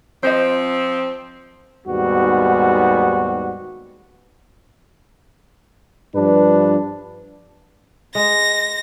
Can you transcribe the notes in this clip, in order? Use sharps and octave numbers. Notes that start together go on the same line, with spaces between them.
F3 C4 C5 D#5
D#2 G#2 G3 B3 F#4
G2 F3 D4 B4
G#3 A#6